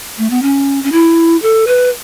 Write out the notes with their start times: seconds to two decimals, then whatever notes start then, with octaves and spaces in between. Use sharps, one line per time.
0.18 A3
0.30 B3
0.42 C#4
0.84 C#4
0.92 E4
1.42 A4
1.67 B4